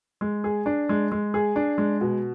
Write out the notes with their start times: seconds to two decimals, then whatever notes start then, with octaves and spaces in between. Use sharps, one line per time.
0.21 G#3
0.44 G#4
0.66 D4
0.89 G#3
1.12 G#3
1.34 G#4
1.56 D4
1.78 G#3
2.01 B2